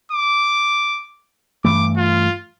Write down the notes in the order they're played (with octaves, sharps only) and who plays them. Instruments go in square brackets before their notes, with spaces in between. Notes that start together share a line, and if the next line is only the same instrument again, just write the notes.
[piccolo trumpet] D6
[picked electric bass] G2 E3 A3 [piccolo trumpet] D6
[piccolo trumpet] F4